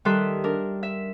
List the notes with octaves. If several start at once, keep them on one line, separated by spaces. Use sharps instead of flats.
D#3 G3 A4 E5 C6 F#6
D4 A#4
E5